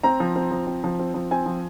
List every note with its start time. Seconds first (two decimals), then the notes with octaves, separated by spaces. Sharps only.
0.04 C4 A#5
0.20 F3
0.36 C4
0.51 F3
0.67 C4
0.84 F3
0.99 C4
1.14 F3
1.31 C4 G#5
1.46 F3